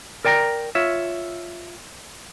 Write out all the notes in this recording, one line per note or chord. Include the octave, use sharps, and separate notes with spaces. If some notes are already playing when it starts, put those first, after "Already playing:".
A#4 D5 G5 A5 A#5
F4 C#5 E5